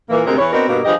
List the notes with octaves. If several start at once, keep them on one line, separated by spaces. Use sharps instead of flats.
A#2 E3 A#3
D2 C3 G#3 C4 G#4 A#4
E2 E3 B4 C#5
B3 C4 D4 D#4 F#4 A#4
G2 B2 A#3
G2 F3 G4 G#4 D#5